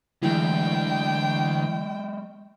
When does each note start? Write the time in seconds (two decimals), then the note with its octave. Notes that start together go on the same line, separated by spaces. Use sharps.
0.23 D2 E3 F#3 G#3 E4 G5